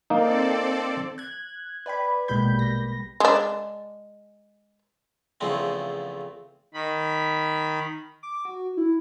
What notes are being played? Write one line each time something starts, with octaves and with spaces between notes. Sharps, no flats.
A#3 C4 D#4 A4 D5
F#6 G#6
B4 D5 G5 B5
A#1 B2 G#3 A#3 B5 G6
G3 A#6
G#3 D4
E2 C#3 F3 A3 C4
D#3 B5
D6
F#4
E4